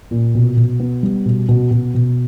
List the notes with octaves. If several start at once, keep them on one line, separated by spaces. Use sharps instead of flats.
A#2
B2
B2
B3
G3
B2
B2
B2
B2